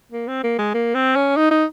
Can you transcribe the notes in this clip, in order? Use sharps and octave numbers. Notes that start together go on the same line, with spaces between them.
A#3
C4
A#3
G#3
A#3
C4
C#4
D#4
D#4